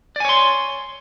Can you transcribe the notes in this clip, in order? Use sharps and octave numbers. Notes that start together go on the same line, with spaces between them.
C#5 D5 G#5 C6